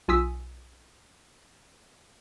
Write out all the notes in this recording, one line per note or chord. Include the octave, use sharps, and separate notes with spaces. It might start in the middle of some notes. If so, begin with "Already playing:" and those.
B1 F4 G#5 D#6 E6 B6